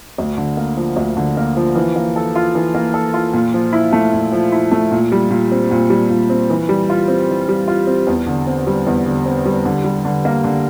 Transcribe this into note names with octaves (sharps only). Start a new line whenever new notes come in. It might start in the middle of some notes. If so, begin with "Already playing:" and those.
D2
D3
A#3
F3
D2
D3
A#3
F3
E3
A#3
A4
F4
E3
A#3
A4
F4
A#2
F3
E4
A3
A#2
F3
E4
A3
A#2
G3
A#2
C4
A#2
G3
A#2
C4
E3
G3
F4
C4
E3
G3
F4
C4
E2
D3
C4
G3
E2
D3
C4
G3
D3
G3
D3
A#3
D3